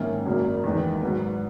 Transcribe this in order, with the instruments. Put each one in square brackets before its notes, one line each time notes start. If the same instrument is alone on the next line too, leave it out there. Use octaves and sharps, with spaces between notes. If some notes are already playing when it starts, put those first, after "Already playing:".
Already playing: [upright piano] G#2 D#3 A#3 C#4 E4
G#1 F#2 C#3 F#3 A#3
E2 D#3 G#3 B3
G#2 F#3 B3